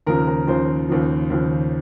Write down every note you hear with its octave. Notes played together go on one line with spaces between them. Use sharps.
D#2 C#3 F3 A#4
A#4
D#2 C#3 F3 C5
D#2 C#3 F3
D#2 C#3 F3